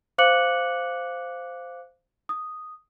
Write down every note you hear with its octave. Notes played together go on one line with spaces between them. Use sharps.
C5 F5 D6 F#6 C#7 F#7
D#6